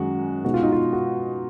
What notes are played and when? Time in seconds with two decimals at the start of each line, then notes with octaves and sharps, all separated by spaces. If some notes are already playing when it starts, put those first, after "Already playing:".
Already playing: F#2 D#3 G#3 C#4 F#4
0.44 B2 G#3 D#4 F#4
0.54 F4
0.63 D#4
0.72 F4
0.93 F#4